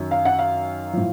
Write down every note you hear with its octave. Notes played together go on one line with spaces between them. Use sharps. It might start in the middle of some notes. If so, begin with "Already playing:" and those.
Already playing: F#2 D#3 F#3
F5
F#5
F5
A2 F3